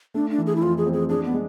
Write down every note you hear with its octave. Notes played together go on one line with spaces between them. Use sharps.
A3 D4
D4
E3
G#4
E4
F2 F4
G#4
C4
G#4
D4 G#4
B3
G#3